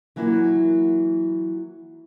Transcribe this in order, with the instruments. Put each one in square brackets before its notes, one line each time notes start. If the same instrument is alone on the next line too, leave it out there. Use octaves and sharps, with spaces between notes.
[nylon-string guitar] E3 F#3 A#3 E4